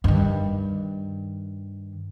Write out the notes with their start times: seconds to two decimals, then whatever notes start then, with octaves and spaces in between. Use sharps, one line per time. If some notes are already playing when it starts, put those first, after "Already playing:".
0.04 G2 D#3